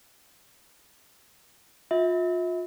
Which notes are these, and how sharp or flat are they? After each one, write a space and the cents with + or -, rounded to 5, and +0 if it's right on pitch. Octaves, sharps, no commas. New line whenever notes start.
F4 +30 E5 -35